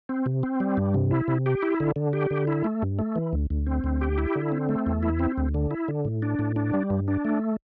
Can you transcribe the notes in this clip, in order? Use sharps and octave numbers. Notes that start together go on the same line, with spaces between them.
C4
C3
C4
G3
G2
C3
E4
C3
G4
E4
D3
D3
G4
D3
E4
A3
G2
A3
E3
D2
D2
C4
D2
G4
E4
D3
C4
A3
E2
E4
C4
D2
D3
E4
D3
A2
D4
A2
D4
G3
G2
D4
A3